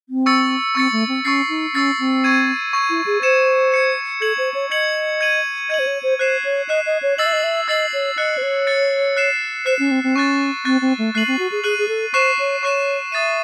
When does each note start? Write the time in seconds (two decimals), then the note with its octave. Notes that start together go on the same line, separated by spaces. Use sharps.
0.09 C4
0.26 C#6 E6 A6 C#7
0.75 C4 C#6 E6 A6 C#7
0.92 A3
1.08 C4
1.24 C#4 C#6 E6 A6 C7
1.49 D#4
1.73 C#4 C#6 E6 A6 C7
1.99 C4
2.24 C#6 G#6 D#7
2.73 C#6 G#6 D#7
2.90 E4
3.06 G#4
3.22 C5 G#6 C#7 E7
3.72 G#6 C#7 E7
4.21 A4 G#6 C#7 F#7
4.38 C5
4.54 C#5
4.71 D#5 G#6 C#7 F#7
5.21 G#6 D#7 F#7
5.70 D#5 G#6 D#7 F#7
5.79 C5
5.87 C#5
6.03 C5
6.19 C5 F#6 C7 E7
6.44 C#5
6.69 D#5 F#6 C7 E7
6.86 D#5
7.02 C#5
7.18 D#5 E6 A6 C7 F#7
7.26 E5
7.33 D#5
7.43 E5
7.68 D#5 E6 A6 C7 F#7
7.93 C#5
8.17 D#5 F#6 A6 C#7
8.38 C5
8.42 C#5
8.67 F#6 A6 C#7
9.16 F#6 C7 E7
9.65 C5 F#6 C7 E7
9.79 C#4
9.91 C4
10.03 C4
10.16 C#4 C#6 F#6 A6
10.65 C4 C#6 F#6 A6
10.81 C4
10.98 A3
11.14 A3 F#6 C7 D#7 F#7
11.27 C4
11.39 F#4
11.52 G#4
11.64 G#4 F#6 C7 D#7 F#7
11.78 G#4
11.88 A4
12.14 C5 C#6 F#6 C7 E7
12.39 C#5
12.62 C#5 C#6 F#6 C7 E7
13.12 E5 D#6 A6 C7 D#7